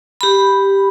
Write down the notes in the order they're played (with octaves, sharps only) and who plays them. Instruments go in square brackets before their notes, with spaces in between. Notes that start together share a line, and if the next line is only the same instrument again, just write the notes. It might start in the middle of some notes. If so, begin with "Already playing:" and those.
[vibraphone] G4 B5